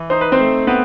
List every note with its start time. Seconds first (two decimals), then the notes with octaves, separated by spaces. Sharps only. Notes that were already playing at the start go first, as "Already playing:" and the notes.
Already playing: E3
0.10 D#4 C5
0.21 B4
0.32 C4 C5
0.39 A3
0.67 B3 C4 B4